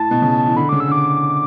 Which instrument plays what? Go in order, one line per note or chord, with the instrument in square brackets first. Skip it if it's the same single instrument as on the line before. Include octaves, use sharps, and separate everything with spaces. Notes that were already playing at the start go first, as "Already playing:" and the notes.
Already playing: [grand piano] A2 [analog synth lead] A5
[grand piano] B2
C#3
E3
[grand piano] D3 [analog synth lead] B5
[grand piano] C#3 [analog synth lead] D6
[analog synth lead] E6
[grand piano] D3 [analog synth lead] D6